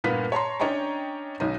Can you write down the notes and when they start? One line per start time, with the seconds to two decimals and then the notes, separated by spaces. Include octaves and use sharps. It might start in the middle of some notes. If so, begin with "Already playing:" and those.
0.04 G2 A#2 A#3 B3 F5 B6
0.32 C#5 A5 A#5 C6
0.60 C#4 D4 C#5 D#5 G5 A#5
1.40 B1 C#4 D#4